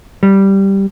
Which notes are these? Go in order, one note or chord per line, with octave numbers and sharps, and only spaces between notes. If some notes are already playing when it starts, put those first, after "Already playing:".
G3